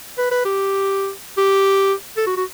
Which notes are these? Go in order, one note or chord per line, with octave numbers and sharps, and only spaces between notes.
B4
B4
G4
G4
A4
F#4
F#4